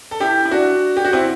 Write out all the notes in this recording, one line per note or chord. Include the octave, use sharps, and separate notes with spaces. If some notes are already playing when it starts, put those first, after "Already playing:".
A4
E4 G4
E4
D4 F#4
G4
F#4
C4 E4